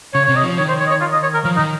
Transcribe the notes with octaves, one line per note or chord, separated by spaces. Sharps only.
C#3 C#5
C3 C#5
D#5
F3
D#3 C#5
C5
C#5
D#5
C#5
F4
D#5
C#5
A#4
F3 A#4
D#4
D#3